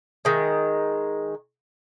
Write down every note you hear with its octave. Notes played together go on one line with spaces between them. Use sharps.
D#3 G#3